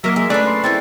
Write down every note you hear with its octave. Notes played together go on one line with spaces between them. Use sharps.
F#3 A#3 A#4 D#5 E5
G#3 E5
A3 C#4 D4 B4 D5
C6
C4 E4 G#4 A4